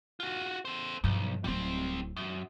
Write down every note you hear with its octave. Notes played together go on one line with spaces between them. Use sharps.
F4 F#4
A4 C5
B1 G2 F3
D1 G3 C4 E4
F#2